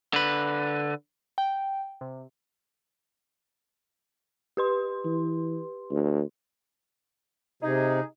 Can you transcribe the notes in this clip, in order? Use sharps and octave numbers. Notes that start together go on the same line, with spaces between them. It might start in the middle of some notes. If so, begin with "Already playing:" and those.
D3 B4
G5
C3
G4 B4 C6
E3
D2
C3 D#4 G#4